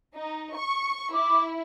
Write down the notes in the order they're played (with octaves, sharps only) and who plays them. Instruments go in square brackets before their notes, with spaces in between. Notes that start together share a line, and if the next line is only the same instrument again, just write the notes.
[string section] D#4
C#6
[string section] E4 [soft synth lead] D6